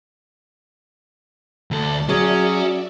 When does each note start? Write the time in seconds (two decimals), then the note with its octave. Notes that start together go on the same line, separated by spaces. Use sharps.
1.71 D2 A4 D5 A5
2.09 F#3 C#4 F#4 G#4 D5 E5